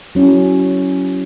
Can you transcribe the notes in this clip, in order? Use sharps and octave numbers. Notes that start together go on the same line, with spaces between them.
F#3 C#4 E4